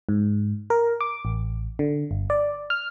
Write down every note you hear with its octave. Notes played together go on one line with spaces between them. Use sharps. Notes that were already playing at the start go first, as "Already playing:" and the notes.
G#2
A#4
D6
A1
D3
G1
D5
F6